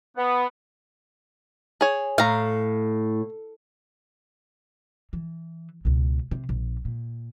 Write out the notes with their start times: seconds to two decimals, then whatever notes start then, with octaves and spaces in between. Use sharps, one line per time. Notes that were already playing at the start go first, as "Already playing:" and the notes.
0.17 B3
1.81 G#4 C#5
2.18 A2 F5 A#5
5.13 E3
5.85 C#2 B2
6.31 C3
6.49 A#1
6.85 A#2